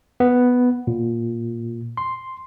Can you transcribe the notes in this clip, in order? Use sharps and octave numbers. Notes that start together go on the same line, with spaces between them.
B3
A#2
C6